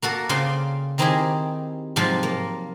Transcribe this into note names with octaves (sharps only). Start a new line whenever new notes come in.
A#3 F#4 A4
C#3 F4 C5 D5 G5 C6
D#3 C4 D#4 E4 G4 G#4
G#2 C3 F3 F#3 F4 A5
A#3